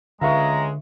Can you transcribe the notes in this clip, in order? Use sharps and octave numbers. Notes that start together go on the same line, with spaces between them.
C#2 D3 G#3 E5 F5 A#5 C#6